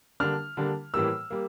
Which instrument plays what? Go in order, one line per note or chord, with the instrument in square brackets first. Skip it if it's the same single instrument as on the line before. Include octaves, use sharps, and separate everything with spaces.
[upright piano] D3 G3 A#3 D4 F6
D3 G3 A#3 D4
A2 E3 G3 A#3 E6
G3 A#3